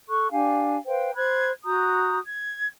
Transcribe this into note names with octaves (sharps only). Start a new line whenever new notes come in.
A4 C#6 F#6
D4 G4 F5 G#5
B4 C5 F5 G5
C5 B5 F#6 G#6
F#4 A#5 D#6 G6
G#6